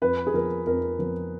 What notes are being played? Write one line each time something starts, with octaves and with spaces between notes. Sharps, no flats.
F2 B4
G#4
F3 B3 A#4
F2 A#4
F3 B3